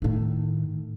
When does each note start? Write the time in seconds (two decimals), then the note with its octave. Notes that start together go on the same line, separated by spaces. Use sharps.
0.02 A2 D#3